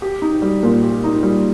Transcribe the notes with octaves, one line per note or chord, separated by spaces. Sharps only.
G4
D#4
G3
A#2
G4
D#4
G3